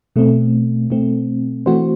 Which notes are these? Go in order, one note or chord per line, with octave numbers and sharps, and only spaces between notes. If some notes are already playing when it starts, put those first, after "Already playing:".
B2 A3 C4
B2 A3 C4
E3 A3 C4 F#4 C5